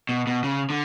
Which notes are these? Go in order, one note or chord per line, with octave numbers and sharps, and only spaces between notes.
B2
B2
C#3
D3